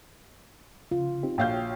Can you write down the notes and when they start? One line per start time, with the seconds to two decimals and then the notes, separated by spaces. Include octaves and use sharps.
0.91 C#3 F4
1.23 C4 D#4 G4
1.38 A#1 F#4 C#5 F5 G5 G6